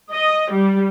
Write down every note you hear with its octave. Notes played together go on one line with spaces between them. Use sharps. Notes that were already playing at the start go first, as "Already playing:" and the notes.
D#5
G3